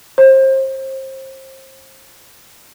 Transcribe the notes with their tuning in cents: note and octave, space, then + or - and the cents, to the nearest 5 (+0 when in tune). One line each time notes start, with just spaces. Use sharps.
C5 +30